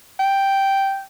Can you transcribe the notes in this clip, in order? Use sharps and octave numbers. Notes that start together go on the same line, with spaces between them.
G5